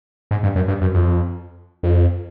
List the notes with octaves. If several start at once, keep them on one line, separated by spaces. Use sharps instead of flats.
G#2
G2
F#2
G2
F#2
F2
F2